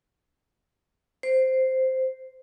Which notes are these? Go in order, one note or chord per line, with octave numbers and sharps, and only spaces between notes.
C5